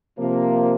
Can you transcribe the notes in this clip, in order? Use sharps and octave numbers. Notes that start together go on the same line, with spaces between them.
C3 F3 A#3